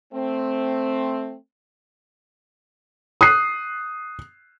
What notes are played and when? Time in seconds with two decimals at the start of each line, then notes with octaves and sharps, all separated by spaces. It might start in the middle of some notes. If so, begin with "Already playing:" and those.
0.13 A3 C4
3.21 D#6 F#6 C7